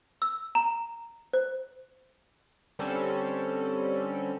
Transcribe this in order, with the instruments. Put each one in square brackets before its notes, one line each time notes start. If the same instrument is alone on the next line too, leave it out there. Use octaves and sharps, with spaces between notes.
[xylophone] E6
A#5
C5
[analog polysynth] D3 G3 C4 C#4 A4